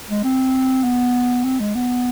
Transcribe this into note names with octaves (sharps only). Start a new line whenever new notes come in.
G#3
C4
B3
C4
G#3
B3